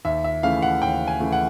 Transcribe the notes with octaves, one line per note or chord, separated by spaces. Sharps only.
D#2 E5
E5
C#3 E3 A3 F5
F#5
D#2 G5
G#5
C#3 E3 A3
F#5